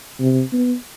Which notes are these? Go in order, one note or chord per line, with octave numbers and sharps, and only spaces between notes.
C3
B3